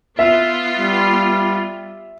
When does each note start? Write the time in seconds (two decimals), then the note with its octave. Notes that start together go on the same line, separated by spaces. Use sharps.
0.19 B3 F4 E5
0.79 G3